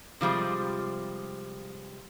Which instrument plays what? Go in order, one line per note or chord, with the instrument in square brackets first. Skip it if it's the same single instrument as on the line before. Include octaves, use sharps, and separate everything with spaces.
[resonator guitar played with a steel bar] C3 F3 G3 G#3